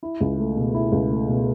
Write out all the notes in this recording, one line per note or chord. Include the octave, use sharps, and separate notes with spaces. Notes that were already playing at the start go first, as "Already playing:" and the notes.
E4
C#2
A3
B2
E4
C#2
A3
B2